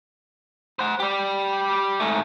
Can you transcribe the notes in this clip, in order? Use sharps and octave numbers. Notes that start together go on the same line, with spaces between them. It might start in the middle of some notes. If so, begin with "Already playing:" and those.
C5 F#5
G4 D5
G#2 A3